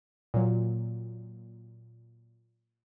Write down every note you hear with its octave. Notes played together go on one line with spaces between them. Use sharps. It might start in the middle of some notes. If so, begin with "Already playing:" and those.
A#2 F#3